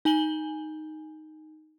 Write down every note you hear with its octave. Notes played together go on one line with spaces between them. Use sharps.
D#4 G#5 F#7 G7